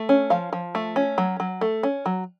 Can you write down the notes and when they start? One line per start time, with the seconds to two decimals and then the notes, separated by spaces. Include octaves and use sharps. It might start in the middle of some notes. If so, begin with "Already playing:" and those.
Already playing: A3
0.09 C#4
0.30 F3 F5
0.53 F3
0.75 A3
0.96 C#4
1.18 F#3
1.40 F#3
1.61 A3
1.83 C#4
2.06 F#3